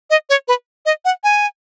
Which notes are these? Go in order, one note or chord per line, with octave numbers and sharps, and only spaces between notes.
D#5
C#5
B4
D#5
F#5
G#5